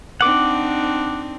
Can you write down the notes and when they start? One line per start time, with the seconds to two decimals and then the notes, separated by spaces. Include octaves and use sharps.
0.21 C4 D4 D#4 F#5 D6